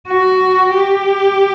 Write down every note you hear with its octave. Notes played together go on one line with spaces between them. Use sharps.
F#4
G4